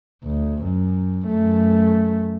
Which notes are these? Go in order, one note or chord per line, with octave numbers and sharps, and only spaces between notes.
D2
F#2
F#2 A3